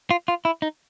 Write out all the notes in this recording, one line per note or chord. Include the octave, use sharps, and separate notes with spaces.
F4
F4
E4
D#4